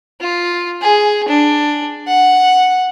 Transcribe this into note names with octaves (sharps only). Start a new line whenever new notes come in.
F4
G#4
D4
F#5